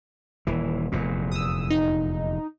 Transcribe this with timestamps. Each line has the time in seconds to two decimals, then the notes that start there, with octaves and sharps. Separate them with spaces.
0.47 D#1 E3
0.92 F1 E2 A#2
1.32 D#6 E6
1.70 D#4